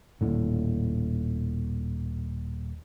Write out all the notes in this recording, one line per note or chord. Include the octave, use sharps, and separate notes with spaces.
D#1 D#2 A2 D3